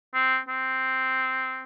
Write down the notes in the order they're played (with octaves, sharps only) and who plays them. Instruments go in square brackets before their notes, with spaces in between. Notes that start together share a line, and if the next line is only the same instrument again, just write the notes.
[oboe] C4
C4